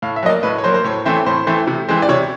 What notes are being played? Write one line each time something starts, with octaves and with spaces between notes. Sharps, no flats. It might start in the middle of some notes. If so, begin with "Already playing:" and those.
A2 F5
E5
F#3 A#3 D#5
D5
A2 B4
C#5
F#3 A#3 C5
C5
A2 C#5
E3 A3 C4 E4
A2 C5
E3 A3 C4 E4
C3
E3 G#3 C4
D5
C3 C#5